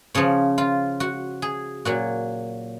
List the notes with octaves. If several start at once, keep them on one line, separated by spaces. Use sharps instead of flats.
C#3 F3 C#5
F4
F#4
G#4
A#2 F#3 F#4